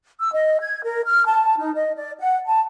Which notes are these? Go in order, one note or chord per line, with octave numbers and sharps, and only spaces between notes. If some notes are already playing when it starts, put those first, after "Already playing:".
E6
D#5
G#6
A#4
F6
A5
D#4
D#5
D5
F#5
A5